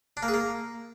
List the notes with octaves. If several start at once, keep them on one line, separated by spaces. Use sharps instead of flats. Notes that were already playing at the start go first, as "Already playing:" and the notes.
D4
A#3
G#4
A#3